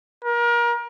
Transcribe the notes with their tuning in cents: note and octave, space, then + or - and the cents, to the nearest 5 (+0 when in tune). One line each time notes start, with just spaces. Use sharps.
A#4 +30